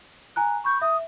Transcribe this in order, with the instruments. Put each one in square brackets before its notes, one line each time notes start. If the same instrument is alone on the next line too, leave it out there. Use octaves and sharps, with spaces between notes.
[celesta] G#5 A#5 F#6
[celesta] B5 G6 [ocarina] C#6
[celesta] E5 [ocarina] D#6